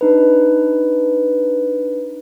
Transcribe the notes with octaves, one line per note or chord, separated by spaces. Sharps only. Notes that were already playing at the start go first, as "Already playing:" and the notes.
D4 D#4 B4